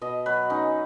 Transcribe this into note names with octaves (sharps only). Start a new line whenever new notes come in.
B2 D#5
F#3 B4
C#4 D#4